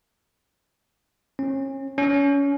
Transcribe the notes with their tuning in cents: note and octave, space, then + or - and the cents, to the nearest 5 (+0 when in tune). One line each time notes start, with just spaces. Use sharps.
C#4 -35
C#4 +25